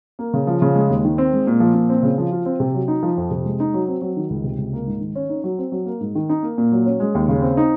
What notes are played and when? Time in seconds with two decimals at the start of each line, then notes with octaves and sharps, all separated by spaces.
0.19 A#3
0.34 C#3
0.47 F3
0.62 C#3
0.75 G#3
0.90 D#2
1.05 D#3
1.18 C4
1.33 G#3
1.47 A#2
1.60 F3
1.74 A#2
1.89 C4
2.03 C#3
2.18 F3
2.32 F4
2.46 C4
2.60 C3
2.74 F#3
2.88 D#4
3.03 F3
3.17 F2
3.31 C3
3.45 G#3
3.60 D#4
3.74 F#3
3.88 C4
4.02 F#3
4.17 D#3
4.30 C#2
4.44 C3
4.58 C#2
4.73 A#3
4.87 G#2
5.01 D#3
5.15 C#4
5.29 D#4
5.44 F#3
5.58 C4
5.72 F#3
5.86 A#3
6.01 G#2
6.15 D#3
6.29 D#4
6.43 A#3
6.58 A#2
6.72 F#3
6.86 C#4
7.00 G#3
7.15 D#2
7.29 C#3
7.42 C4
7.57 D#4